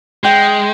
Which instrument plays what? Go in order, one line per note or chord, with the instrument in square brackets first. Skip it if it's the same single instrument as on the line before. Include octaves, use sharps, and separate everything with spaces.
[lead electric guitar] G#3 [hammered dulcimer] G5